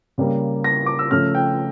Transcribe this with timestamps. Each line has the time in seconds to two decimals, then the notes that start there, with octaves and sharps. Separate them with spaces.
0.18 C#3 G3 A#3
0.64 A#6
0.86 D6
0.99 E6
1.11 C#3 F3 A3 C#4 F6
1.35 G5